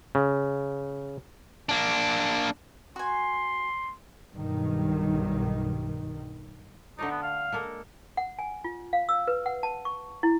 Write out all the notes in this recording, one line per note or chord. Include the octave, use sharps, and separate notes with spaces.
C#3
A#3 D4
F#4 G#5 C6
B1 G2 D#3
D3 A3 D#4 D5
B3
F5
G#3 A#3 A4
F#5
G#5
F4
F5
E6
B4
F#5
A5
C#6
E4